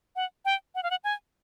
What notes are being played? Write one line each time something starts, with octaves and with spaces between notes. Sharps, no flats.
F#5
G5
F#5
F5
F#5
G#5